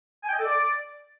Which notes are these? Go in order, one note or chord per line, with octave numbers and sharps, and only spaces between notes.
G#5
G5
D#5
A4
D5